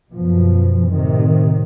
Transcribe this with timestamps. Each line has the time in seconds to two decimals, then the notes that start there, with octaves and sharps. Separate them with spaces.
0.12 F#2 B2 F3
0.90 A2 C3 D#3